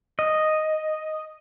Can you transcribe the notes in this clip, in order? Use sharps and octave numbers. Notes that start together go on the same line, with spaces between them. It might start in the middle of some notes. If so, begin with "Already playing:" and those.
D#5